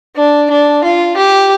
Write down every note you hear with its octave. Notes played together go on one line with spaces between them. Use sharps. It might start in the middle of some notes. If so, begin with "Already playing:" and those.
D4
D4
F4
G4